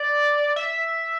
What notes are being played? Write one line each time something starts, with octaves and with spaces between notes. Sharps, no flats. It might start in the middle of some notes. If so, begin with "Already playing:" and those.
Already playing: D5
E5